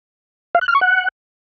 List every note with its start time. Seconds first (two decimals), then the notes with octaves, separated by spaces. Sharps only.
0.55 F5
0.61 F#6
0.68 F6
0.75 C#6
0.81 F#5